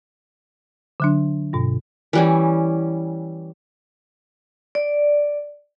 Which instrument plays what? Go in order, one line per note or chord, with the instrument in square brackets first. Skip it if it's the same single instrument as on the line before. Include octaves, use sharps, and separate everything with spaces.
[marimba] D3 F#3 D4
G2 B2
[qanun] E3 G3 C#4
[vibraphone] D5